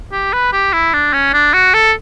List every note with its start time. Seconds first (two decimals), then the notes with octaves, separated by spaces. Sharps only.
0.13 G4
0.33 B4
0.53 G4
0.73 E4
0.94 D4
1.14 C#4
1.34 D4
1.54 F#4
1.74 A4